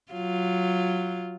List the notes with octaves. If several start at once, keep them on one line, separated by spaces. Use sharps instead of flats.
F#3 F4